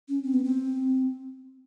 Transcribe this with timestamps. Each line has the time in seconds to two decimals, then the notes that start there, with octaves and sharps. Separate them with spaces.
0.09 C#4
0.24 C4
0.34 B3
0.44 C4